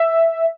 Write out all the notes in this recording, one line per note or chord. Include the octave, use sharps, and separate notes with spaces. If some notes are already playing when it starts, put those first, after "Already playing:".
Already playing: E5